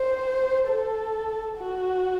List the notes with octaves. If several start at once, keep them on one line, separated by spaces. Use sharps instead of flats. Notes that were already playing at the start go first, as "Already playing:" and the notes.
Already playing: C5
A4
F#4